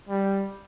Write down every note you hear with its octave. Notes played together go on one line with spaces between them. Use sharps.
G3